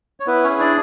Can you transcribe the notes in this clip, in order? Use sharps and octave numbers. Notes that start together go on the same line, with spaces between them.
C#5
B3 E4 B4
C#4 C#5
G#4
D4 D5